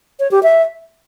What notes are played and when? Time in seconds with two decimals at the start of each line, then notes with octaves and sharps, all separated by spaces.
0.20 C#5
0.31 G4
0.43 E5